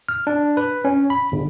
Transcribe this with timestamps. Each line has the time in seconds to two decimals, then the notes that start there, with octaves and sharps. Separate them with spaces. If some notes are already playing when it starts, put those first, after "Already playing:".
0.09 F6
0.27 D4
0.57 B4
0.85 C#4
1.10 B5
1.32 G1